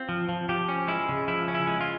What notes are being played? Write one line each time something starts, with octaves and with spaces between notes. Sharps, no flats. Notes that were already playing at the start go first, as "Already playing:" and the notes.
Already playing: C4 F4
F3
F3
F3 G4
C#4
G#3 E4
C#3
F3 E4
C#4
E4
G#3
F4